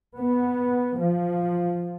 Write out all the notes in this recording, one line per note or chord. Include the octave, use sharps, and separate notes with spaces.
B3
F3